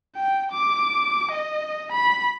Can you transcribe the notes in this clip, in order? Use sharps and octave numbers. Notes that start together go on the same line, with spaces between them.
G5
D6
D#5
B5